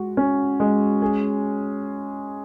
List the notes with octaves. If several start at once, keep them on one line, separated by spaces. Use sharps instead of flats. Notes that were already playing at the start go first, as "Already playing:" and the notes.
Already playing: G#3 F#4
C#4
G#3
G#4